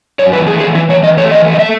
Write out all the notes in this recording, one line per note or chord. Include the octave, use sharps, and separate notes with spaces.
F#2 C#5
E3 B4
A3 G#4
E3 G#4
E3 E4
E3 C#5
E3 D#5
A3 C#5
E3 D#5
A3
D#5
A3 E5